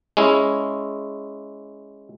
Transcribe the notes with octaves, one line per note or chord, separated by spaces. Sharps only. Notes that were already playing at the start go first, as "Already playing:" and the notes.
G#3 C#4 E4